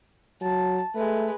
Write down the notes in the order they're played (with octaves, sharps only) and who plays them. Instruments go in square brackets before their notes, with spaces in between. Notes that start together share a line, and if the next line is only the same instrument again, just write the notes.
[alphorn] F#3 [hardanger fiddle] A5
[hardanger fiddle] G#3 B4 [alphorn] A3